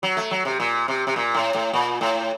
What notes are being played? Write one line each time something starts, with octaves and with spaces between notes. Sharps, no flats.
F#3
A3
F#3
C3
A#2
C3
C3
A#2
A2
A2
A#2
A2